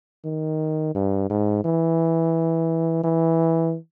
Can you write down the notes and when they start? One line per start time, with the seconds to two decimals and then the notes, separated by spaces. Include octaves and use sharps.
0.25 D#3
0.95 G2
1.30 G#2
1.65 E3
3.04 E3